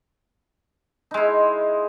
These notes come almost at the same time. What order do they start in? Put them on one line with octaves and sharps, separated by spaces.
D#4 G#3 E4